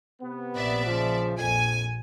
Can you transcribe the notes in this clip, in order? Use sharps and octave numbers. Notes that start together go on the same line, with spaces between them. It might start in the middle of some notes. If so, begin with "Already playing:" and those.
C3 B3
A#1 D5 E5
C#3 F3
A#1 F2 G#5